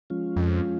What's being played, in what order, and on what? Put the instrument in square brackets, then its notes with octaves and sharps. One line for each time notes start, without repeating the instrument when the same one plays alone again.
[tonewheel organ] F3 G#3 C#4 F4
[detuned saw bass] F2